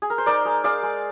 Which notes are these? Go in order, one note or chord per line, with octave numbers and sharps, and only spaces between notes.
G#4
A#4
C5
D#4 A#4 D5
G#3
G#3 D5 F5
G#3